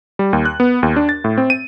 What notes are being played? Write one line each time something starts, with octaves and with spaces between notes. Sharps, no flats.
G3
D#2
F#6
B3
D#2
D4
A6
A2
C4
D#7